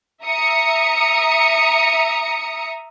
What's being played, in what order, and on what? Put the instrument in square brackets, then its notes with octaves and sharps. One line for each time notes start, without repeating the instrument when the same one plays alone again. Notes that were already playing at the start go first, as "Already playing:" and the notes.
[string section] E5 A#5 D#6 C#7